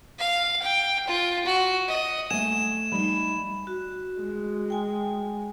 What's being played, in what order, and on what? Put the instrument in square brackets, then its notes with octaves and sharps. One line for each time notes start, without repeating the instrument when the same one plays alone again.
[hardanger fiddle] F5
G5
F4
F#4
D#5
[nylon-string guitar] A3 F#5 [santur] G#5 [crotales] E7
[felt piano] G3 D#4 [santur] B5
[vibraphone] F#4
[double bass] G#3
[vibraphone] G5 G#5